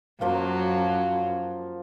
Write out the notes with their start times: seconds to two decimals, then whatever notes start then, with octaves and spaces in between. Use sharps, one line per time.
0.21 F#2 F3 F#3 A#3